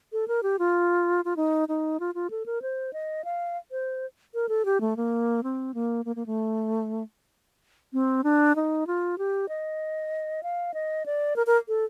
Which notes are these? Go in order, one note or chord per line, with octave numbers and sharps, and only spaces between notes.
A4
A#4
G4
F4
F4
D#4
D#4
F4
F4
A4
A#4
C5
D#5
F5
C5
A#4
A4
G4
A3
A#3
C4
A#3
A#3
A#3
A3
C4
D4
D#4
F4
G4
D#5
F5
D#5
D5
A#4
A#4
A4